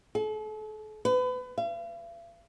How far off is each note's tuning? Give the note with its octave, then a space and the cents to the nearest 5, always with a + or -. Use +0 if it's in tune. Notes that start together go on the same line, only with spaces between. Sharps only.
A4 -40
B4 +30
F5 -45